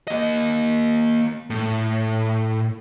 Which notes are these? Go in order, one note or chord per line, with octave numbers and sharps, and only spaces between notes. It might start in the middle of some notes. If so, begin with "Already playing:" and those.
A#3 D#5
A2